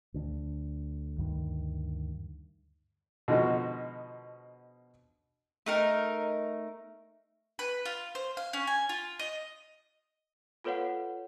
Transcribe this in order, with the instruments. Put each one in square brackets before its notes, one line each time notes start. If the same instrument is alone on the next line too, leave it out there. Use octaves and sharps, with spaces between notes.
[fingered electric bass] D2 D3
D2 G2 D#3
[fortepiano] B2 D3 F3 G#3 D#4 F#4
[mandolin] A3 D#4 A#4
B4
F4
C5
F5
C#4
G#5
F4
D#5
[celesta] F4 A4 B4 C#5 F5 F#5